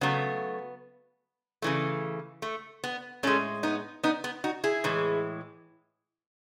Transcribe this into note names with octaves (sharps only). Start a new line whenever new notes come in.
C#3 F#3 A3 B3
C#3 E3 A3
A3
B3
A2 G#3 A3 C#4
B3 D#4
B3 D#4
B3
D#4 F#4
E4 G#4
A2 E3 G#3